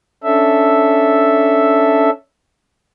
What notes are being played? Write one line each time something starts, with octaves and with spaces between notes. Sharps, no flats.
C#4 D4 A4 E5